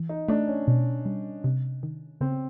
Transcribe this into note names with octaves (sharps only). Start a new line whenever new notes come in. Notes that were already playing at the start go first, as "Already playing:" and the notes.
Already playing: E3
D#4
A3 D4
C#4
B2
G3
C3
D#3
C#3 C4